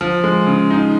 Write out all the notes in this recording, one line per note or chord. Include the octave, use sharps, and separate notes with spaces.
F3
G#3
C#3
D#4